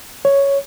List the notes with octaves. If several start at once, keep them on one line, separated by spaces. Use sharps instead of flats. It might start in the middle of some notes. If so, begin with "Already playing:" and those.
C#5